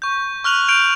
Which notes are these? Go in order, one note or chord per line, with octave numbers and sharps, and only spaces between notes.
C#6 G6
C#6 F6 F#6 F7 F#7
F6 G6 D7 F7